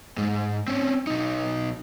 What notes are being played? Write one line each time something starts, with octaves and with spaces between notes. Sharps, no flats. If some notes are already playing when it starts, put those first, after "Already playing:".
G#2 G#3
C4 C#4
B1 D#4